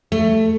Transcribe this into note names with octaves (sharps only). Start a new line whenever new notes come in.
A3